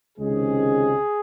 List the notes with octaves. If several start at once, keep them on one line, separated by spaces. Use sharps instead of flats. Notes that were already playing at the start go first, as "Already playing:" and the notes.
C#2 C3 D#3 G#3 C#4 G#4